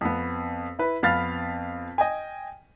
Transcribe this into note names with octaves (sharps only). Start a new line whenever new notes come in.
F2 B3
E4 B4
F2 B3 F5 B5 F6 A6
D#5 G5 G#5